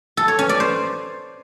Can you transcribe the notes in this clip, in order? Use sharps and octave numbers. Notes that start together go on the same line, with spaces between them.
A4
C#5
C#4
D5
C5